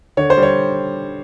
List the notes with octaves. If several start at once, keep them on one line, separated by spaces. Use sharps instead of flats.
D3 C#5
C5
G3
C#5